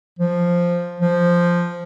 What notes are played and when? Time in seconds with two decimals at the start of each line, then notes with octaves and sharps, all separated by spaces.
0.19 F3
1.00 F3